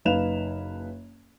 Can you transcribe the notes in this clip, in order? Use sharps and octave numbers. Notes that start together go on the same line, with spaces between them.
F#1 D#4 B4 F5 E7 F7